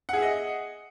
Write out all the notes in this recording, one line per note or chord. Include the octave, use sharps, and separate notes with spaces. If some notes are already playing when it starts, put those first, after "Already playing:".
G#4 D#5 E5 F#5